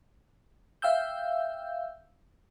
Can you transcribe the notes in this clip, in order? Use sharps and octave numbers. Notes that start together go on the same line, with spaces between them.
E5 F5 G5 E6 G6